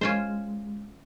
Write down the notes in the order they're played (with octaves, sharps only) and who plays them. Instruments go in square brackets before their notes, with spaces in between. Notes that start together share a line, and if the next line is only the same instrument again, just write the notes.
[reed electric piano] G#3 [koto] C#4 F4 C5